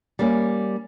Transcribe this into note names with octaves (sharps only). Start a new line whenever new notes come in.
G3 A#3 C#4